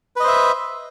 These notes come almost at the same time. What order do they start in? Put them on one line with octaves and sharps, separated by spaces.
B4 D#5 C5 E5